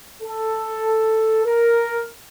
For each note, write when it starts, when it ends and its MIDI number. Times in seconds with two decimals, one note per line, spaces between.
0.22 1.44 69
1.45 2.04 70